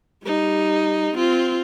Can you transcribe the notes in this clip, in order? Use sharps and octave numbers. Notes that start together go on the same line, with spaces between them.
G3 D#4
C4 F4